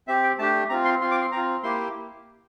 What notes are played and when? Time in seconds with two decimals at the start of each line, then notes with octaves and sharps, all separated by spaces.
0.08 C4 G4 E5
0.23 G5
0.39 A3 D4 G4 A5
0.69 C4 F4 A#5
0.85 C6
1.01 C4 F4 C6
1.11 D6
1.22 C6
1.32 C4 A#5
1.37 F4
1.63 A#3 E4 G4 C6